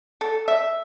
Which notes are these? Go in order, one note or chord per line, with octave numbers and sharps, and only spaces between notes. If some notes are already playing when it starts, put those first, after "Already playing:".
A4
E5